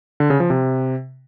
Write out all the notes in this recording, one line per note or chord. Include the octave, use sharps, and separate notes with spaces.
D3
C#3
F3
C3